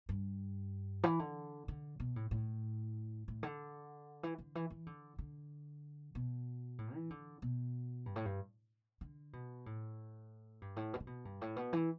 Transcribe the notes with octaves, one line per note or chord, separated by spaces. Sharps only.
G2
E3
D3
D3
B2
A2
A2
A2
D3
E3
D3
E3
E3
D3
D3
B2
A2
E3
D3
B2
G2
A2
G2
D3
B2
A2
G2
A2
B2
D3
B2
G2
A2
B2
E3